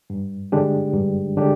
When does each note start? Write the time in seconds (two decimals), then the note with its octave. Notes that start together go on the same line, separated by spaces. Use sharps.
0.10 G2
0.52 D3 G#3 D4 G4
0.94 G2
1.37 D3 G#3 D4 G4